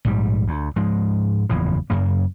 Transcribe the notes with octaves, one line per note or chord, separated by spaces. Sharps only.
A#1 G#2 G3
D2
G#2 F3 G#3
F#1 E2 A2 F3
F#2 C#3 A#3